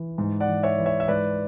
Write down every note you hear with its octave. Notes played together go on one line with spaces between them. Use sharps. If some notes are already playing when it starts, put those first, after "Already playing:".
Already playing: E3
G#2
D5 F#5
E3
C#5 E5
E3
C#5 E5
E5
G#2 B4 D5